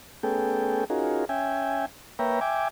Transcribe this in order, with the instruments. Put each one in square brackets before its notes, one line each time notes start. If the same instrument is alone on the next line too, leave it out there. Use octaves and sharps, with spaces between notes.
[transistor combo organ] A3 B3 C#4 G#4 A4 G5
C#4 D#4 F4 F#4 G#4 A#4
C#4 E5 G5 G#5
A#3 B4 C#5 E5 G5 A#5
E5 G5 G#5 D6